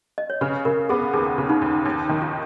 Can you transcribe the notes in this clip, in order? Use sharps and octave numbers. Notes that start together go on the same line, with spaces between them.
D#5
C#5
C#3 B4
C#3 A#4
B3 G#4
D#2 G#4
C#3
D#4
D#2
D#2 D#4
D#3
F4